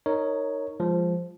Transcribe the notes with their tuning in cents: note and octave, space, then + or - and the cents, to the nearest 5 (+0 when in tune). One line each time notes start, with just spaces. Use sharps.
D#4 +0 A#4 -20 C#5 +0
F3 +0 G#3 -20